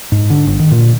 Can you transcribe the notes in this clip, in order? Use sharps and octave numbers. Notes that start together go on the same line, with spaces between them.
G#2
D3
G1
D#3
A#2